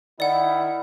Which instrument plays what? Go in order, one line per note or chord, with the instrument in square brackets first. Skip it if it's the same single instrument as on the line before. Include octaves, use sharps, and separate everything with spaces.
[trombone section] D#3 E4 [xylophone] D5 F#5